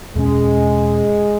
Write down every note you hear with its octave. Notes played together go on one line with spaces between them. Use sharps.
E2 B2 G#3 A#3 C#4